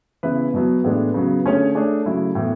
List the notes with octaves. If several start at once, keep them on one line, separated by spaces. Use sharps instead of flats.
C#3 E3 B3 E4 B4
B2 F#3 B3
A2 E3 G#3 B3 D4
C#3 F#3 B3
D3 A3 C#4 G#4 C#5
A3 D4 G#4 C#5
C#3 F#3 A3 E4
A2 E3 B3